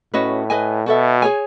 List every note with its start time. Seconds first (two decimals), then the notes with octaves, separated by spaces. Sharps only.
0.14 A2 C#4 F#4 B4 D#5
0.50 B4 D#5 G#5
0.86 B2 F#4 A4 E5
1.22 G#4 C#5 G#5